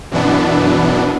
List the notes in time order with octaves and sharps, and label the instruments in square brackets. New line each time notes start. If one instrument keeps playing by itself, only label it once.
[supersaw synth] F#2 B2 E3 B3 D4